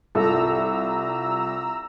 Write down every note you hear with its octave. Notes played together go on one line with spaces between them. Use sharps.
C2 F4 A4 A#5 E6